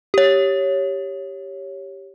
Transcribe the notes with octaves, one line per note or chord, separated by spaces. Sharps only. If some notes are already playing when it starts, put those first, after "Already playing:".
G4 C#5